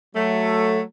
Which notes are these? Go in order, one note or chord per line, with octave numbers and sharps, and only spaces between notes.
F#3 A3